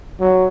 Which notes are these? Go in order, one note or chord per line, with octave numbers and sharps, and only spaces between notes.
F#3